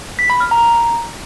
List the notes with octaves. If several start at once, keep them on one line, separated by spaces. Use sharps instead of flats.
B6
B5
F6
A#5